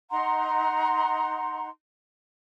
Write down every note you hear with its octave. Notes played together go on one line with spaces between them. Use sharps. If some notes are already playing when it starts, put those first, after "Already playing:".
D#4 F#5 A#5 C6